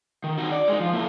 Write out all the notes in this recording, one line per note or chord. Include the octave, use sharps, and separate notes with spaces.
D#3
D#4 F#4
D5
G#3 D#4
F3
A#3 E4